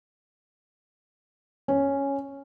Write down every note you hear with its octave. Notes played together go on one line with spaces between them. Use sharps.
C#4